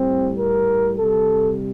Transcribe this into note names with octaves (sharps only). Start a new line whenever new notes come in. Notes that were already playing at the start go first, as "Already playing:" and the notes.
Already playing: A2 G3 C4
A#4
C3 G3 A4